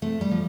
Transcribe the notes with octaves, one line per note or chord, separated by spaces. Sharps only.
C3 A3
G3
F3